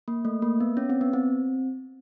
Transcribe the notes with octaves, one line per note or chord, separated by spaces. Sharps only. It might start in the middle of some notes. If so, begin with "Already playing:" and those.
A#3
A3
A#3
B3
C#4
C4
B3
C4